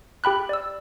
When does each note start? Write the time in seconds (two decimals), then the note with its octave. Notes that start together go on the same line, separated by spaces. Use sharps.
0.24 G4 G5 B5 F#6
0.49 D5 E6